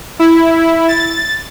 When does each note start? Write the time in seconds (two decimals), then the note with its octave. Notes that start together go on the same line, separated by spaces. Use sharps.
0.19 E4
0.88 A6